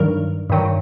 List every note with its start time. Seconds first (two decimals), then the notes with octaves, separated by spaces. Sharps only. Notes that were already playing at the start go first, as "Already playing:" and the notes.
Already playing: G2 D#3 F#3 A#4
0.50 G2 D#3 F#3